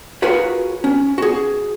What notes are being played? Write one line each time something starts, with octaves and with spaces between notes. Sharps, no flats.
F4 F#4 G#4 A#4 B4 C#5
C#4
F#4 G#4